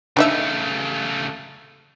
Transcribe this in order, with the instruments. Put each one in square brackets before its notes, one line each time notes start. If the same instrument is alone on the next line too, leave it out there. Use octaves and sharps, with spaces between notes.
[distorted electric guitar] C#3 A3 [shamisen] D4 D#4 E5